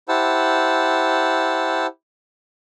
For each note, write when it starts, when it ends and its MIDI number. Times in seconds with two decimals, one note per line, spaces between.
0.09 1.86 64
0.09 1.86 67
0.09 1.86 72
0.09 1.86 78
0.09 1.86 81
0.09 1.86 88